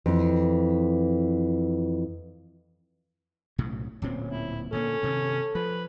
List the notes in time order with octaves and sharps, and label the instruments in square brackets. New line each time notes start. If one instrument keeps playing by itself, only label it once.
[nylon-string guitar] F2 E3
[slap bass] B1 A2 C#3
[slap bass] D1 A#2 C4 [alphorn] C#4
[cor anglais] E4
[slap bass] A#2 D3 A#3 [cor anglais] C#4 [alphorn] A4
[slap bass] G2 C3 D#3
[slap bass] F3 [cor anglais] B4